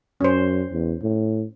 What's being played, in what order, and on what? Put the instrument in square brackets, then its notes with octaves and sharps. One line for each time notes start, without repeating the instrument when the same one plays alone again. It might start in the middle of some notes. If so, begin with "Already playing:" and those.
[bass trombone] F#2 [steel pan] C#4 C5
[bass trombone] E2
A2